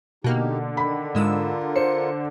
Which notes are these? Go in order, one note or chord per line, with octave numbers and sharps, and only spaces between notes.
B2 D3 A#3 D#4 G4
D#3 B5
G#2 G#3 F4 A#4 E6
C5 C#7